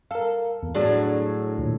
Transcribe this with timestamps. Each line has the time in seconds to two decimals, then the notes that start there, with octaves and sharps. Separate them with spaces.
0.11 A4 A#4 F5
0.63 E2
0.75 A2 F#3 D4 G#4
1.58 D#2 A#2